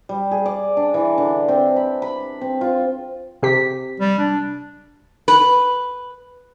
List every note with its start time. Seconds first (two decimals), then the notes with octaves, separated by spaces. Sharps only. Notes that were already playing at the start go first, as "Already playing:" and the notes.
0.09 G3
0.31 G#4
0.46 D5
0.77 D4
0.94 E3
1.18 D3
1.48 C4
1.76 B5
2.02 B5
2.41 C4
2.61 F4
3.43 C3 G4 B6
4.00 G3
4.19 D4
5.28 B4